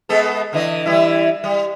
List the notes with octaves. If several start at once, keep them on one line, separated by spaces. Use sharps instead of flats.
G#3 B3 A4
D3 E3 D#5
E3 G3 E4
G3